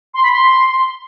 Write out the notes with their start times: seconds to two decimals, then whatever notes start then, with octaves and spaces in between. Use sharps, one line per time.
0.14 C6
0.23 B5
0.32 C6